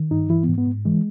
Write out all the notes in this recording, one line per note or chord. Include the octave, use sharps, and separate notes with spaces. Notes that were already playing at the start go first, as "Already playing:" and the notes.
Already playing: D#3
G2 D#4
E3 E4
B3
G#2
B3
G#2
E3 G#3